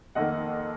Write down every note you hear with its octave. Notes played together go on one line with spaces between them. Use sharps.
F2 D#3 A#3 D#5 F#5